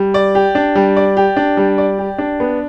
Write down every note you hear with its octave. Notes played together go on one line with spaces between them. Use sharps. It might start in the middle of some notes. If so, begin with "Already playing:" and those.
Already playing: G3
D5
G4
D4
G3
D5
G4
D4
G3
D5
G4
D4
B3